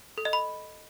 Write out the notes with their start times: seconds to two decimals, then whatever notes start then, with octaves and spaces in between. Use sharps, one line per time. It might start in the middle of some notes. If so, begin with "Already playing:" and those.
0.18 A4
0.25 D#5
0.33 B5